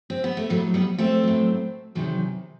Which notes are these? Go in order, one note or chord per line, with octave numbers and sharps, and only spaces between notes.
C4
B3
A3
A2 F#3 G3
G3 B3
A3 C4
A2 F#3
E2 C3 D#3 F#3